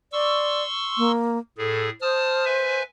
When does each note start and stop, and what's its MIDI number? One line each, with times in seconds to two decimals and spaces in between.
0.13 0.64 74
0.13 1.12 84
0.13 1.12 85
0.13 1.12 88
0.98 1.38 58
1.58 1.90 45
1.58 1.90 68
1.58 1.88 69
2.01 2.82 72
2.01 2.45 81
2.01 2.45 87
2.01 2.45 89
2.45 2.83 71
2.45 2.83 76
2.45 2.83 80